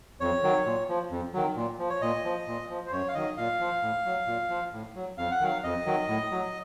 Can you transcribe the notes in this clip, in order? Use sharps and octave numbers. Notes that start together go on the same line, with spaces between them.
F2 C#5
D#3 F#3
A#2
F3
F2
D#3 F#3
A#2
F3
C#5
A#2 D#5
F3
A#2
F3
C5
F#2 C#5
F5
D#3 F#3 D#5
A#2 F5
F3
A2
F#3
A#2
F3
A2
F#3
F2 F5
F#5
D#3 F#3 F5
F2 D#5
D#3 F#3
A2
F#3